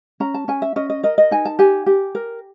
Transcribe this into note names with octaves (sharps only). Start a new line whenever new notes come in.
C#4 A#5
A5
C#4 G#5
E5
C#4 D#5
D#5
A#4 D#5
D#5
D#4 G#5
A5
G4 G#5
G4
A#4